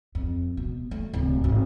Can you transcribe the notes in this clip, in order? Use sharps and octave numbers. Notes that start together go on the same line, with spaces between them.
F2
B2
A3
D1 C2
G#1